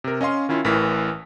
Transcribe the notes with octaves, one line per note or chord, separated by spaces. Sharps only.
C3 A#4
C#4 D#5 F5 C6
D#3 C#4 E4 F4
A1 A2 E3 A#4 B6